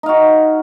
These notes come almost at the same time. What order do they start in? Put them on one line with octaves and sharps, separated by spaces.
D#4 F5 F#4